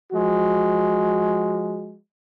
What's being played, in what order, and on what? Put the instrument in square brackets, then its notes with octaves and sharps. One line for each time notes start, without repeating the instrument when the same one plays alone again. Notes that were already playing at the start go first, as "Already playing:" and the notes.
[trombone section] F3 G#3 F#4